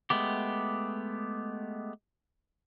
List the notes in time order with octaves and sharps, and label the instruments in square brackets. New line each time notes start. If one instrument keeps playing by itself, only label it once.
[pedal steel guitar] G#3 A3 B3 G4